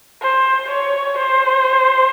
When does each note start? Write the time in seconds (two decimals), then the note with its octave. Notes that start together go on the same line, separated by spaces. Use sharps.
0.22 C5
0.70 C#5
1.18 C5